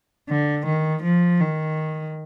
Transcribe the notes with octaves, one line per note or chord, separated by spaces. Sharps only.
D3
D#3
F3
D#3